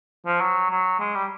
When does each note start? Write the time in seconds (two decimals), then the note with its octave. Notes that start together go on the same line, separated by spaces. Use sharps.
0.26 F3
0.41 F#3
0.71 F#3
1.00 G#3
1.15 G3